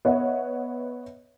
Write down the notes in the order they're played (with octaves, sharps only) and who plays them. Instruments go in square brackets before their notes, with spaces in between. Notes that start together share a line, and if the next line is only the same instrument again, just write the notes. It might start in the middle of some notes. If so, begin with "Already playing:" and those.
[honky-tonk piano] B3 C#5 D#5 E5 F#5